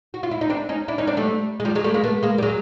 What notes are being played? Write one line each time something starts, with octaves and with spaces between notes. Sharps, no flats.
F#4
F4
E4
D#4
C4 D4
C#4 D#4
D4 E4
C#4 D#4
C4 D4
G3 A3
G#3
F3 G3
F#3 G#3
G3 A3
G#3 A#3
A3 B3
G#3 A#3
G3
F#3 G#3